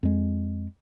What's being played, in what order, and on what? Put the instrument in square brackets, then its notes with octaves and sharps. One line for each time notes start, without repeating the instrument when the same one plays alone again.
[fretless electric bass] F2 G#3